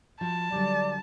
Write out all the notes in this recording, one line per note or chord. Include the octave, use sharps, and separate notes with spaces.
F3 F#4 A5
D3 F#3 G3 D5